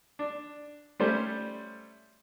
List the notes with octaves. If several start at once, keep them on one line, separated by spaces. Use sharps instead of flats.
D4
G3 A3 C#4 C5